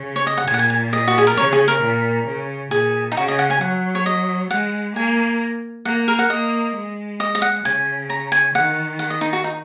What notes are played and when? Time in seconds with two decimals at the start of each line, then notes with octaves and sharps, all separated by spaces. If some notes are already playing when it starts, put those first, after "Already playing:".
Already playing: C#3
0.16 C#5
0.27 D#5
0.37 F#5
0.47 A#2 G#5
0.54 F#5
0.59 G#5
0.70 G#5
0.93 D#5
1.08 F#4
1.18 G#4
1.27 A#4
1.37 C#3 C#5
1.53 G#4
1.68 A#4
1.82 A#2
2.27 C#3
2.71 A#2 G#4
3.12 D#4
3.17 C#3 F#4
3.28 D#5
3.39 F#5
3.50 G#5
3.61 F#3 F#5
3.95 C#5
4.06 D#5
4.50 G#3 F#5
4.96 A#3 G#5
5.85 A#3 F#5
6.08 A#4
6.19 F#5
6.30 A#3 D#5
6.75 G#3
7.20 D#5
7.35 D#5
7.42 F#5
7.64 C#3 G#5
8.10 A#5
8.32 G#5
8.54 D#3 F#5
8.99 F#5
9.10 D#5
9.21 D#4
9.33 F#4
9.44 D#4